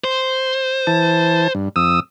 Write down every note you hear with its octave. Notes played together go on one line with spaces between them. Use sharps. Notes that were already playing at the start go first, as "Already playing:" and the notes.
C5
E3 A5
G2
F2 D#6 E6